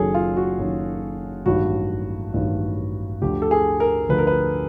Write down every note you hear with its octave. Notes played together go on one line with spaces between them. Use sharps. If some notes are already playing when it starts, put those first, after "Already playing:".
Already playing: F#1 F#2 D#3 F#3 G#4 A4
F4
F#4
F#1 F#2 D#3 F#3
A1 G2 D#3 F#3 F#4
A1 G2 D#3 F#3
D2 D3 F3 G4
A4
G#4
A#4
D2 D3 F3 B4
A#4
B4